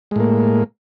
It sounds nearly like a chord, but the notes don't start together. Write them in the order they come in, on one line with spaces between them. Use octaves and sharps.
G#3 A2 A#3